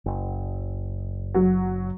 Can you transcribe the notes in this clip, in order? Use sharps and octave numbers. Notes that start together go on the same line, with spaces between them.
F#1
F#3